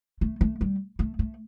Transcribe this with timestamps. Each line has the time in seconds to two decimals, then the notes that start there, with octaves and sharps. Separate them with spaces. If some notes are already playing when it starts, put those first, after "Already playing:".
0.21 A3
0.41 A3
0.61 G3
0.99 A3
1.19 A3